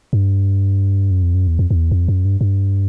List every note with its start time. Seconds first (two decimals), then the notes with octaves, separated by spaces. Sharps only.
0.13 G2
1.11 F#2
1.23 F2
1.34 F#2
1.48 E2
1.59 F2
1.71 F2
1.76 E2
1.91 F2
2.08 F#2
2.25 G2
2.41 G2